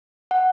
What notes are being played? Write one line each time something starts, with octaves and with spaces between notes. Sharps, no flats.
F#5